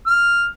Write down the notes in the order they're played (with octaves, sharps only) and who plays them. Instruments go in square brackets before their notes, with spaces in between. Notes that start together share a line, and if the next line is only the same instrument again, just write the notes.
[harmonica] F6